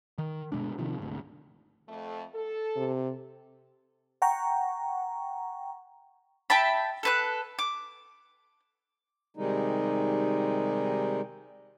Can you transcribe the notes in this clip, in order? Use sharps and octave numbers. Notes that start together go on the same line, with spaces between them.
D#3
G1 B2 G#3 D4
C3 D#3 F3
G#1 D2
F2 A3
A4
C3
F#5 G5 A#5 C#6
E5 G5 A5 B5
A4 B4 F#6
D6
C3 D#3 G3 G#3 D#4